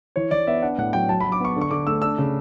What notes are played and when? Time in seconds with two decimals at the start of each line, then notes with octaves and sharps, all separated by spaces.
0.16 E3 C#5
0.31 E3 D5
0.47 B3 E5
0.62 D4 F#5
0.78 A2 F#5
0.93 F#3 G5
1.09 F#3 A5
1.20 B5
1.24 F#3
1.32 D6
1.40 B3 C#6
1.56 D3
1.61 C#6
1.71 D3 D6
1.87 A3 E6
2.02 D4 E6
2.18 C#3